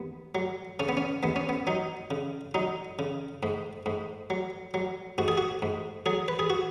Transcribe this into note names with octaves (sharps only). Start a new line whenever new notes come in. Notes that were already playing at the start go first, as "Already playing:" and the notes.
Already playing: D#2 B3
F#3
C#3 C#4
B3
C#4
D#2 B3
C#4
B3
F#3 D#4
C#3
F#3 D#4
C#3
G#2
G#2
F#3
F#3
G#2 F#4
G#4
F#4
G#2
F#3 G#4
B4
G#4
F#4